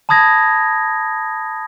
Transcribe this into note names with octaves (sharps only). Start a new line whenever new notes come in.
A5 B5 D#6 G#6 A#6